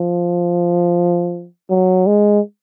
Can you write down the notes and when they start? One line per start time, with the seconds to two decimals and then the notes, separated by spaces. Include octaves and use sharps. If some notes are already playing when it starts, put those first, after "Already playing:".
Already playing: F3
1.70 F#3
2.07 G#3